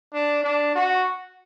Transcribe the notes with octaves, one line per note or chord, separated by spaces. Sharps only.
D4
D4
F#4